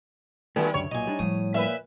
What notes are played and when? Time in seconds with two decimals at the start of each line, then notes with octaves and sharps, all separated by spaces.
0.56 D#3 G3 A3 B3 F#4
0.74 C#2 F#2 D3 C#5
0.91 B1 A#2 D#5 G#5
1.07 G3 D4 D#4
1.19 A2 F3 G3 D#6
1.54 A#2 B4 E5